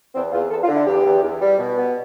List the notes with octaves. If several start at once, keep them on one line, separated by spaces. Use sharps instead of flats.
E2 C4
E2 F4
E2 A4
F4
D3
E4
E2 G4
E2
E2
G3
B2
B3